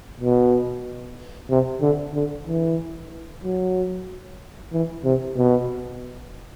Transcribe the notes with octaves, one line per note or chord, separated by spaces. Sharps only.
B2
C3
D3
D3
E3
F#3
E3
C3
B2